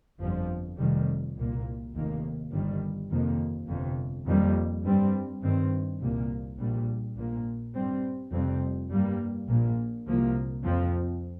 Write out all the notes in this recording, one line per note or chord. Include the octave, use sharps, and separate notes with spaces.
G1 F2 F3
F1 F2 D#3 G3
C2 A#2 A#3
F1 D#2 D#3 A#3
G1 G2 D#3 G3
F2 C3 D#3 A#3
G1 F2 C3
F2 D#3 G3 A#3
G2 G3 C4
G2 D#3 C4
C2 A#2 A#3
A#1 A#2 G3
A#1 A#2 A#3
G2 G3 C4
F1 F2 C3 G3 C4
G2 G3 A#3
A#1 A#2 A#3
C2 C3 F3 A#3
F2 F3 C4